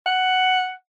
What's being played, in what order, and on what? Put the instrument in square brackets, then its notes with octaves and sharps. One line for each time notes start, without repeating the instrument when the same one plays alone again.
[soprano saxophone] F#5